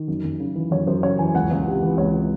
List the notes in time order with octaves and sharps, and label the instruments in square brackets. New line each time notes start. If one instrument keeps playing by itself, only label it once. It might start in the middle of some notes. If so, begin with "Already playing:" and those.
Already playing: [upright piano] D#3
F#2
F#2
C#3
E3
F#2 C#5
F#2 C5
C#3 C#5
E3 G#5
C#2 F#5
C#2
C3
E3
C#2 C#5